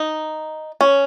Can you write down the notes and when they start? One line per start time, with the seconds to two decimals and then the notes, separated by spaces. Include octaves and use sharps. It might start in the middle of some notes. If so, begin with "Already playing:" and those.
Already playing: D#4
0.81 C#4